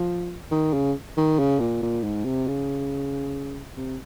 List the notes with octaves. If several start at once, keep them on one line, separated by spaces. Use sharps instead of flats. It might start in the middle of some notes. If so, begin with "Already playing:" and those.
Already playing: F3
D#3
C#3
D#3
C#3
A#2
A#2
G#2
C3
C#3
C3